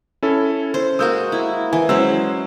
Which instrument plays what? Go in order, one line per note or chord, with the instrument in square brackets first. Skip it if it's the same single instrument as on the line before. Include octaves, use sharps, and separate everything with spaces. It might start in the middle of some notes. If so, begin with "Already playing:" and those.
[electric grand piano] C#4 E4 A4
[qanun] C5
[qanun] G#3 A#3 F#4 [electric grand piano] D#6 E6 G6
[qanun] E4
[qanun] E3 [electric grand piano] G#5
[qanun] F#3 C#4 B5 [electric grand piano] G#3 C5 E6